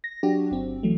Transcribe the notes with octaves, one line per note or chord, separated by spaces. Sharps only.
A#6
F#3 D4 F#4 G4
G1 C4
E3 F#3 A3